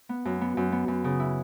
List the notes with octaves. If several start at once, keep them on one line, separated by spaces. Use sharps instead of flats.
B3
F#2
B3
F#2
B3
F#2
C#3
E4